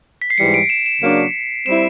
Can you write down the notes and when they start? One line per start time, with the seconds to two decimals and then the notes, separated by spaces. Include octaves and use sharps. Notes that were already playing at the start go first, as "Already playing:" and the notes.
0.22 B6
0.30 C7
0.38 G#2 E3 G3 C#7
0.54 D7
0.70 E7
0.86 E7
1.02 C#3 F#3 A#3 D4
1.66 G3 C4 E4 E7